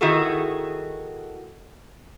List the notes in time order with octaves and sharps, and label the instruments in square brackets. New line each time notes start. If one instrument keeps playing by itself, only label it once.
[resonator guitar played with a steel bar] D#3 E4 F#4 G#4 A4